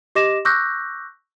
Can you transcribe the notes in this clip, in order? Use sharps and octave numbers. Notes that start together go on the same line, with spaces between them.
G4 D#5 D6 A#6 E7
C#6 D6 E6 F#6 G6 A#6